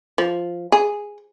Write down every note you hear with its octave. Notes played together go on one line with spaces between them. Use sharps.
F3
G#4